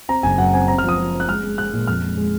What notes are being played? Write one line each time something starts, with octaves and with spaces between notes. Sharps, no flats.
C4 A#5
F#1 G#5
F#2 F#5
C4 G#5
C4 A#5
F6
F3 D#6
F3
C4
F#6
G#3 F6
G#3
G#3 F#6
A#2
F2 F6
G#3
G#3